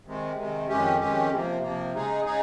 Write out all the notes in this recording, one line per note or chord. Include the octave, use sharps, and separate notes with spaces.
C3 D#3 G#3
C3 D#3 G#3
F2 D#3 G#3 C#4 G4
F2 D#3 G#3 C#4 G4
C3 F3 A#3
C3 F3 A#3
C#3 G#3 D#4 G#4
C#3 G#3 D#4 G#4